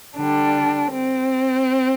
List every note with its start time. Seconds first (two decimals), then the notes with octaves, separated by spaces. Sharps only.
0.16 D3 G3 D4
0.92 C4